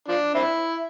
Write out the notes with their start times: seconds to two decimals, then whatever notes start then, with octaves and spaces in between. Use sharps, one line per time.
0.08 F3 D4
0.34 C4 E4